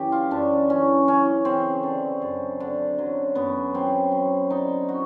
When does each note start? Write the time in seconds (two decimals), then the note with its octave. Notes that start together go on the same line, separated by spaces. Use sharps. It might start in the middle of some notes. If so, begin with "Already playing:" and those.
Already playing: F#2 E3 G4
0.12 F4
0.31 F#2 D4
0.69 E3 C#4
1.08 E3 C#4
1.45 C#3 C4
1.83 D3
2.22 F#2
2.60 D3
2.98 F#3
3.35 F#2 B3
3.74 F#3 C4
4.12 F#3
4.50 D3 D#4
4.89 F#4